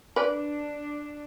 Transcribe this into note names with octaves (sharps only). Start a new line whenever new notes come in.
D4 B4 D5